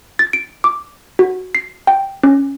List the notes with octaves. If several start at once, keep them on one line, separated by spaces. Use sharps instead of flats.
A6
D7
D6
F#4
C7
G5
C#4